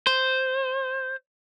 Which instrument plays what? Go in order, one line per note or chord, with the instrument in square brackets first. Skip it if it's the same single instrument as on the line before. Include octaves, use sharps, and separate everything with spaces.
[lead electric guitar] C5